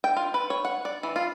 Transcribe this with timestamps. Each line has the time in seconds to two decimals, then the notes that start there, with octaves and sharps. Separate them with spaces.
0.04 G5
0.17 F4
0.34 B4
0.50 C#5
0.65 F#5
0.85 D5
1.03 E3
1.16 F4